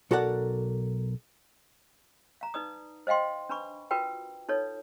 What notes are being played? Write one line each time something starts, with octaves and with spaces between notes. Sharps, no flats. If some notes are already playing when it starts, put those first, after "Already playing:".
B1 F#4 A4 A#4 D5 F#5
F5 A#5
D#4 B4 D5 D#6
C5 D#5 F5 G5 C6
D4 B4 B5 C#6
F4 F#4 A#4 B4 G5
D#4 F4 A4 B4 C#5